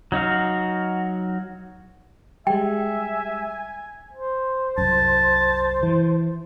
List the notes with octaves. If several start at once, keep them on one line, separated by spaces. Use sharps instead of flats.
F#3 D#4 F#4 F5
G3 G#3 E5 G5 G#5
C5
C2 F#2 A5
E3